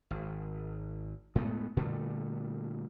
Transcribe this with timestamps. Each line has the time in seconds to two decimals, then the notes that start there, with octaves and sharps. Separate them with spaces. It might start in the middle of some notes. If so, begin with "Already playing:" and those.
0.11 G#1
1.35 A2 G#3 A3 B3
1.77 A#2 D3 G3 A3